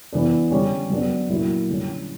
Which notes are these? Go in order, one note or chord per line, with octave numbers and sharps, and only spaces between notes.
E3 B3 D4
D3 G3 C#4
F#3 B3 D4
A#2 F#3 A#3 E4
D3 G3 C#4